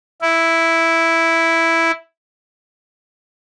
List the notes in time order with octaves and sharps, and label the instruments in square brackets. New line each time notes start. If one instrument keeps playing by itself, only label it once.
[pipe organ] E4